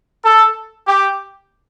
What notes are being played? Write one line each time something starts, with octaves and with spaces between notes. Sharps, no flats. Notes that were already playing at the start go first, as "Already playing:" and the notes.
A4
G4